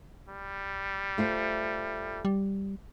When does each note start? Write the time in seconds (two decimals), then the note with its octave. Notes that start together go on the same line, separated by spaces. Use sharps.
0.28 G3
1.18 A3 F4 C5
2.25 G3